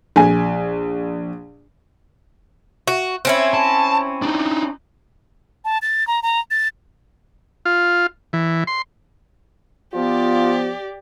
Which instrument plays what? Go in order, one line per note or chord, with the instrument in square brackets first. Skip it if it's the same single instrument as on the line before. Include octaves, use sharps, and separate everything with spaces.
[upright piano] A#1 G#5
[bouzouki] F#4
C4 C#4 E4
[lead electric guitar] A5
D4 D#4
[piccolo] A5
A6
A#5
A#5
A6
[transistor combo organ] F4
E3
C6
[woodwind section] F3 B3 [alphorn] F4 [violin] G4 D5